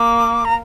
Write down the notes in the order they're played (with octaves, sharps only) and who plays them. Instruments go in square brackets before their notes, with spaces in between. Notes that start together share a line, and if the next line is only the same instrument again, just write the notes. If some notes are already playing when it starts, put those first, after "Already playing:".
Already playing: [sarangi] A#3 [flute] D6
[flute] A#5